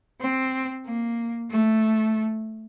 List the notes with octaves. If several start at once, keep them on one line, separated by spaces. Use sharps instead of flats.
C4
A#3
A3